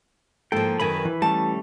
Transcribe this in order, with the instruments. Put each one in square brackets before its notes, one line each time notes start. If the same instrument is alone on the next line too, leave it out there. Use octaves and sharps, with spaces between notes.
[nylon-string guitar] G#2 F3 [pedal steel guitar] A#3 G5 [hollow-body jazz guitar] A4
[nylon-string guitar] F#2 D#3 [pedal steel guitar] B4 G#5 B5
[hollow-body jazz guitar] E3
[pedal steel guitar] G3 A3 C#4 [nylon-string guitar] A5